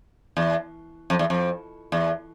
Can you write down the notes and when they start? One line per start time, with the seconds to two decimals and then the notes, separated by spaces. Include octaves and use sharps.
0.37 E2
1.10 F2
1.19 E2
1.30 F2
1.92 E2